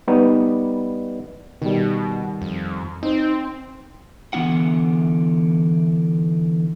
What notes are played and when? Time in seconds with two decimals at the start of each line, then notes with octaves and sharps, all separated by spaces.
0.08 G3 B3 D#4
1.62 B2 D#3 G3
2.42 F2
3.03 C4 D#4 C5
4.33 D3 E3 B3 E4 F#5